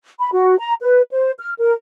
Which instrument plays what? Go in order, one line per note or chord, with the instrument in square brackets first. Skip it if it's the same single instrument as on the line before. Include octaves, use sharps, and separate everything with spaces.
[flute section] B5
F#4
A#5
B4
C5
F6
A#4